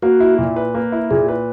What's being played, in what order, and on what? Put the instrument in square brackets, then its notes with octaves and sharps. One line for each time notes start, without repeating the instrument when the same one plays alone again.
[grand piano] A#3 [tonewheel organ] F#4
[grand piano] E4
A#2
B4
A#3
E4
[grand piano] A#2 [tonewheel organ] G#4
[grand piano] B4